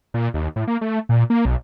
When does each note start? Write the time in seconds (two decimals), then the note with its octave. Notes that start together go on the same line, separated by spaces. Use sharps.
0.14 A#2
0.34 D#2
0.56 A2
0.67 A#3
0.81 A3
1.09 A#2
1.30 A#3
1.45 B1